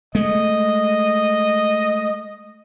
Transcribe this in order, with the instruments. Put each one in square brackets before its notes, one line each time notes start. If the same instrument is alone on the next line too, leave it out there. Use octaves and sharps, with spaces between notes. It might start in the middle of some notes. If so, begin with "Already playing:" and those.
[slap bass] G#3 A3 [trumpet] D#5